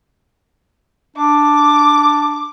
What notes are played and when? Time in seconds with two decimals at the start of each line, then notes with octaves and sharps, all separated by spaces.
1.17 D4 D6